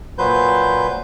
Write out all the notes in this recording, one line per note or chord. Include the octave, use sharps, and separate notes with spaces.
A#2 F#3 B4 C5 G6